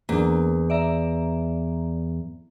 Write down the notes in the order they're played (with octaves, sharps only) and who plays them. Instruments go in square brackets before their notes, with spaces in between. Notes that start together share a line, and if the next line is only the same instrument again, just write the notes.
[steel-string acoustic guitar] E2 [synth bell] A#3 D4
[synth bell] D5 E5 A#5